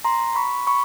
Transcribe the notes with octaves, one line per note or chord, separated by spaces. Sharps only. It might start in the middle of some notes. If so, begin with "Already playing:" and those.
A#5 C6
B5 C#6
B5 C#6